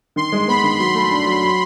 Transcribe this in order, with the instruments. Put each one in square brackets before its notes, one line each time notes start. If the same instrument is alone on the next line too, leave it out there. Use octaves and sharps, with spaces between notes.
[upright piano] D#3 [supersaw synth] C6
[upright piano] G#3
[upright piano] B3 [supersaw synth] B5
[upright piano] D#3
[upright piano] F#3 [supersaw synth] C6
[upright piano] A3
D4
F#3
F#3